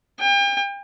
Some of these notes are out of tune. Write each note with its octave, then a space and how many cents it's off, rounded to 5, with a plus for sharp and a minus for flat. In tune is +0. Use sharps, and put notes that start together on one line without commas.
G5 +40